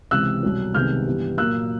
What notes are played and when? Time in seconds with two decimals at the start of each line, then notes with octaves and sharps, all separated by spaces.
0.11 C#2 C3 E3 E6 F#6
0.43 C2 B2 F#3
0.74 C2 C3 D#3 G#3 B3 F6 G6
1.06 G2 E3 G3 B3
1.38 A#2 F#3 A#3 E6 F#6